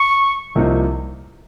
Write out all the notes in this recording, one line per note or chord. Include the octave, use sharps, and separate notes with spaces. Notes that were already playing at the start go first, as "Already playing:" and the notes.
Already playing: C#6
C2 C3 F3 A#3 D#4